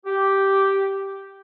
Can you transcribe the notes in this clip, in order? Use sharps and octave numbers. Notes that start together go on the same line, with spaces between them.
G4